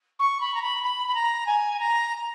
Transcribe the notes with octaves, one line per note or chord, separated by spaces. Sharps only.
C#6
B5
A#5
B5
B5
B5
A#5
G#5
A#5